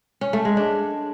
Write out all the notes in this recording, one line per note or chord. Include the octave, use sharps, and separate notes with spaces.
C#4
A3
G#3
D4